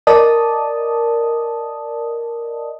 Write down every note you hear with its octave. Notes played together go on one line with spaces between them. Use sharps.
A#4 D5 D#5 A5 D#6